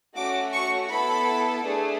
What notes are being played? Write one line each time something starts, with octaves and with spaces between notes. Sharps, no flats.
A3 C#4 F#4 D6
C#6
B3 E4 A4 B5
A3 D4 G#4